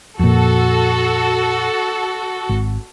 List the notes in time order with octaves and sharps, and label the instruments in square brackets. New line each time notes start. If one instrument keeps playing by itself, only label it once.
[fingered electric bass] F2 A#2 [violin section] F#4 A4
[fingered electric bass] G#1